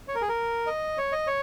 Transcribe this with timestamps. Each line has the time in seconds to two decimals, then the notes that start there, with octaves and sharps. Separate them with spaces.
0.08 C#5
0.15 A#4
0.21 G#4
0.29 A#4
0.67 D#5
0.98 C#5
1.12 D#5
1.27 C#5